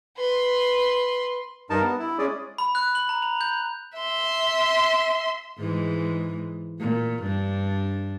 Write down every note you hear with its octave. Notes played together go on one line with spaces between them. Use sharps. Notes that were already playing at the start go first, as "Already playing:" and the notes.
B4 C6
G2 D#4 A#4 A5
B3
E4
G#3 C#4 G#4 D5
B5
F#6
F#7
A#5
F7
G6
E5 C6
G#2 E3 G#3
A#2
G2 D4